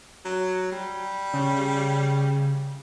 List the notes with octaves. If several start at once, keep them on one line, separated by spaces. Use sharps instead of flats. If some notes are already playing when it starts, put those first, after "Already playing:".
F#3
G3
C#3